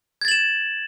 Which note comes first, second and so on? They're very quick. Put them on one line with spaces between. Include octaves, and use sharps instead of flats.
G#6 A6 F#7 E7